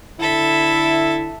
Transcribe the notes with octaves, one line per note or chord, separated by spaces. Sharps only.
D3 E4 A4 E5